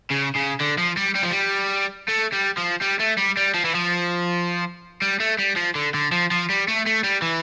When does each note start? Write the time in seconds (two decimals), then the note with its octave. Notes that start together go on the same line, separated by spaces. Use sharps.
0.11 C#3
0.36 C#3
0.61 D3
0.78 F3
0.97 G3
1.15 G3
1.23 F3
1.31 G3
2.08 A3
2.32 G3
2.57 F3
2.81 G3
2.99 A3
3.17 G3
3.37 G3
3.54 F3
3.65 E3
3.74 F3
5.02 G3
5.20 A3
5.39 G3
5.56 F3
5.75 D3
5.94 D3
6.12 F3
6.31 F3
6.50 G3
6.68 A3
6.86 A3
7.04 G3
7.22 E3